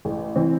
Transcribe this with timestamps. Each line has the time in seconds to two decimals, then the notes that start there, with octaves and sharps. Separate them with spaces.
0.05 A1
0.36 E3 C4